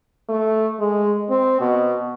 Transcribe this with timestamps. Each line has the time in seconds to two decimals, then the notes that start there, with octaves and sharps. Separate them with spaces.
0.29 A3
0.80 G#3
1.30 C4
1.60 B2